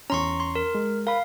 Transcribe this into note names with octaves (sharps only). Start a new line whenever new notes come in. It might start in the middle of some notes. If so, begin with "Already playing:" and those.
E2 C#4 A#5 C6 C#6
C6
A#4
G#3
A#4 F5 B5